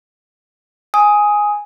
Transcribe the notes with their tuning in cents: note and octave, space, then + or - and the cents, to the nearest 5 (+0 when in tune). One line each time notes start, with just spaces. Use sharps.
G#5 +0 D#6 +15